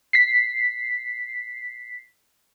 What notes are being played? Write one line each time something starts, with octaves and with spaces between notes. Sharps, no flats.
B6 C7